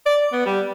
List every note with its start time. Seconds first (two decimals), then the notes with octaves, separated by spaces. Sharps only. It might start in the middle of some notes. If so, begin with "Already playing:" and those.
0.06 D5
0.33 B3
0.46 G3